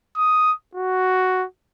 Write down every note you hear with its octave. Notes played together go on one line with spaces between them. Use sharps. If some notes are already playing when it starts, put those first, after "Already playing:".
D#6
F#4